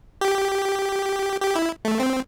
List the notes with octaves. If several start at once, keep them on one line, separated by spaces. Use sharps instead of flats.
G4
G4
E4
A3
C4